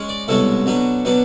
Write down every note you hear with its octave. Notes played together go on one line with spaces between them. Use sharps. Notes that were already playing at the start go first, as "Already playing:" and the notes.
Already playing: G#3 C#4
D5
C2 B2 G#3 C#4 A4
B2 F#3 B3 D4
B2 F#3 B3 D4